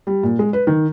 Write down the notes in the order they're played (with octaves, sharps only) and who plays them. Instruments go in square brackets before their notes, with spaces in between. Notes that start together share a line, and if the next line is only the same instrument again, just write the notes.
[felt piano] G3
A#2
G#3
B4
D#3